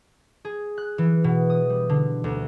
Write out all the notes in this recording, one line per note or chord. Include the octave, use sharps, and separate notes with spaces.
G#4
F#6
E3
B2
D#6
G3
D3
D2